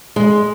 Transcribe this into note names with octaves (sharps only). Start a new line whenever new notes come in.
G#3